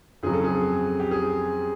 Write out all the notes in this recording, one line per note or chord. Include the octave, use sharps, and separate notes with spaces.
F2 C#3 F#3 G#4
A4
G#4
G4
G#4